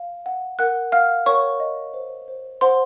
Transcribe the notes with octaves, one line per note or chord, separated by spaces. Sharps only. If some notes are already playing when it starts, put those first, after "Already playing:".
Already playing: F5
F#5
A#4 F#5 F#6
F5 F#5 F6
A#4 C#5 C#6
D#5
C5
C5
C5 F#5 C6